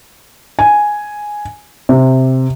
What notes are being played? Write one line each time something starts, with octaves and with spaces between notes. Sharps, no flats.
G#5
C3